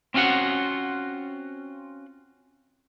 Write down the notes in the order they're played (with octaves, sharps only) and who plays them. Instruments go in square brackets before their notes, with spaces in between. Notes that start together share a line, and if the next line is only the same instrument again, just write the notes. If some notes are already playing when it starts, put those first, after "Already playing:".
[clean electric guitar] C4 C#4 F4 F#4 F#5